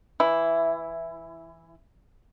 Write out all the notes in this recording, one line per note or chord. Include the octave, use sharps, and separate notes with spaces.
E3 E4